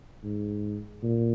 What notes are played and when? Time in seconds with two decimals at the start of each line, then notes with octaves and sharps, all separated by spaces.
0.24 G#2
1.03 A#2